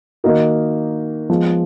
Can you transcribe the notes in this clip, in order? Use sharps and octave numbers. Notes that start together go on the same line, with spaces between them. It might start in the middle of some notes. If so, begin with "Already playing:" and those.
D#3 A#3 D#4 F#4 A#4
F3 G#3 B3